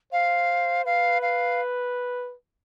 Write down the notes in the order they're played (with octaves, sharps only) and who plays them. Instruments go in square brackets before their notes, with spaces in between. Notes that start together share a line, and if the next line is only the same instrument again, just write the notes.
[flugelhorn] C5 [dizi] F5
[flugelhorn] B4 [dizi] F5
[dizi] F5